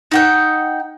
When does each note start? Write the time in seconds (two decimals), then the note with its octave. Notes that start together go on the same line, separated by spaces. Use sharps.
0.12 D#4 F#5 G5